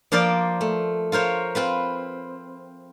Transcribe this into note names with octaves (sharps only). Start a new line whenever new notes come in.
F3 A#3 F4 A#4 C5 D5
A3
F4 A#4 C5 C#5
C4 F4 B4